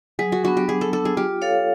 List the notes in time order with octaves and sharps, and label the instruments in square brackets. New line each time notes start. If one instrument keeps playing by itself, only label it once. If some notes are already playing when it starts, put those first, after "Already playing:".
[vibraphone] F#3 [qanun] G#4
[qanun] F#4
[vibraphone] B3 D4 [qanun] F#4
[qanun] G4
[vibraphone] F#3 [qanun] G#4
[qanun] A4
[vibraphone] B3 D4 [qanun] A4
[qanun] G#4
[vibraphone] F4 [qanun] G4
[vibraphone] A4 C#5 F5